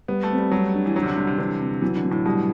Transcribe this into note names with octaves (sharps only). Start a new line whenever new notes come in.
G3 B3
A3
C4
G3
F#3 G3
D4
E3
F#3 D4
C3
D3
C3 G3
C3
D3 E3
C3
E3 F#3
D3
F#3
A2
B2 G3